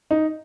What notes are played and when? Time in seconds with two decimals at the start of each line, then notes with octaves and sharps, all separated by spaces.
0.11 D#4